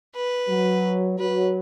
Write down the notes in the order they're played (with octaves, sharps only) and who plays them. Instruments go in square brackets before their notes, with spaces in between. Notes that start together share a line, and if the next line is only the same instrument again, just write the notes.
[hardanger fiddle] B4
[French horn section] F#3
[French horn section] F#3 [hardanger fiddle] B4